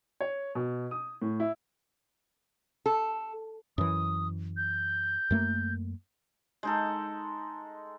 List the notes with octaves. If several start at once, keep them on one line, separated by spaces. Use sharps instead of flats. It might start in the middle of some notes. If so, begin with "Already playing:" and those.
C#5
B2
D#6
A2
E4
A4
F#2 E3 D#6
G6
F#2 A3 A#3
G#3 D#4 A4